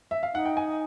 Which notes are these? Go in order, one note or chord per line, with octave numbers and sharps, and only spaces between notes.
E5
F5
D#4 F#5
G5
G#5